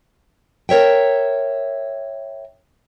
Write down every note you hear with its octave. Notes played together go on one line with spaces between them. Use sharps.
A#4 C#5 E5 G5